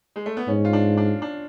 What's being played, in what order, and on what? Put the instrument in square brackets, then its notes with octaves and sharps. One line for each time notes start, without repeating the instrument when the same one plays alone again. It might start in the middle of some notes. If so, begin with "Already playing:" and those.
[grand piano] G#3
A3
B3
[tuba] G#2 [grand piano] C#4
[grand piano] F4
D4
D4
D4